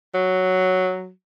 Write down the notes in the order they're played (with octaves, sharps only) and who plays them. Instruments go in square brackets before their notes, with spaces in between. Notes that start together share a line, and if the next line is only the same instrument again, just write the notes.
[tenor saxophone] F#3